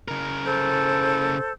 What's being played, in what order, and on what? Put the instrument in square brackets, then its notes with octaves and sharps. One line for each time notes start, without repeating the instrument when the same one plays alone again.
[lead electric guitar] C#3 A#4
[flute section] A4 C5 G6